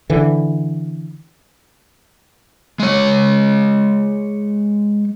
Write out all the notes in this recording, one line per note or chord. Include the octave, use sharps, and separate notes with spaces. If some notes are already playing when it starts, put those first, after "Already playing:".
D3 E3
G#3 C#5